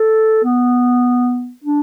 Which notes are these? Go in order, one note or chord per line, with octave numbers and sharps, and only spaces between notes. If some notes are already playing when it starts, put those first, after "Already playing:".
Already playing: A4
B3
D4